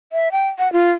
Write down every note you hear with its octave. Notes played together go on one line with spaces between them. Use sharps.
E5
G5
F#5
F4